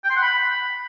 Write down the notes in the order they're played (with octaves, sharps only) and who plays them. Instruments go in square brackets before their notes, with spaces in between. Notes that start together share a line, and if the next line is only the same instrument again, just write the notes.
[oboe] G5
C6
F#5
B5